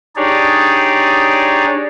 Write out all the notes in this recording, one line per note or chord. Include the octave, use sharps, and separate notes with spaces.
D4 D#4 G4 G#4 C#5 D5